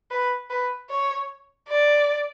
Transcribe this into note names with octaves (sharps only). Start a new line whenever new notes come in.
B4
B4
C#5
D5